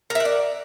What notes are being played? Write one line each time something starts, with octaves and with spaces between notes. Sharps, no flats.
A#4 D5 E5 F#5